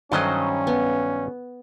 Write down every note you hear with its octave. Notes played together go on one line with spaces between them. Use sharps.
G2 D#3 F#3 C#4 A4 C5 D#5
B3